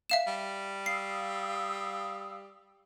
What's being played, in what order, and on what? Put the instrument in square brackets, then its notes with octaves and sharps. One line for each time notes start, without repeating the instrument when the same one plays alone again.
[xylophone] E5 F5 E7
[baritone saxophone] G3
[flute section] F5 D#6 E6 [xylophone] C7